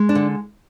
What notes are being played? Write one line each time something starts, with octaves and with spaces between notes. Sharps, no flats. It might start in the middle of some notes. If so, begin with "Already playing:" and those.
Already playing: G#3
D4
D3